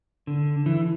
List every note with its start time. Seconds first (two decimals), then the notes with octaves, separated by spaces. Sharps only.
0.27 D3
0.66 E3